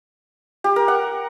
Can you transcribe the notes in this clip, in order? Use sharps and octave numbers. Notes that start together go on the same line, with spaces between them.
G4
A#4
F#5